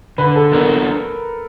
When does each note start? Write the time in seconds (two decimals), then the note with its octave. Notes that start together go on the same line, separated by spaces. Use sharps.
0.18 D3 B4
0.36 A4
0.52 F#3 B3 D4 F#4 A#4